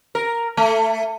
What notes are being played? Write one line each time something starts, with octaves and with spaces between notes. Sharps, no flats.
A#4
A3